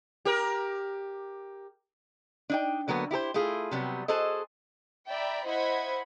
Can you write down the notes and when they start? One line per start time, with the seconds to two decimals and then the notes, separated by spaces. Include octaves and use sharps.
0.25 G4 A#4
2.50 D4 D#4 G5
2.88 D3 F#3 A#3 B3
3.11 E4 G4 A4 C5
3.34 A3 E4 F4 G#4
3.71 C3 F#3 G3 B3
4.08 F#4 G#4 A4 C5 D#5
5.08 D5 E5 G5 A#5 B5
5.46 E4 C5 D#5 F#5 B5 G#6